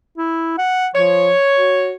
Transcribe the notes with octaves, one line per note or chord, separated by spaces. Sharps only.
E4
F#5
F3 C#5
F#4